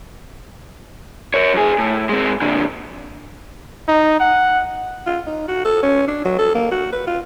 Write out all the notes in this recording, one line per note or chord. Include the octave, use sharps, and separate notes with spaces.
A#4 C#5
F#2 G#4
A2
G#3 C4
A#2 D3
D#4
F#5
F4
D#4
F#4
A4
C#4
D4
F#3
A4
A#3
F#4
B4
F4